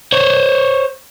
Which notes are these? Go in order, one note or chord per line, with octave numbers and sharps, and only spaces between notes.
C5 C#5